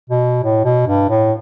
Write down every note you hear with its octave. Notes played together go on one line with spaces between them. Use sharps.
B2
A2
B2
G2
A2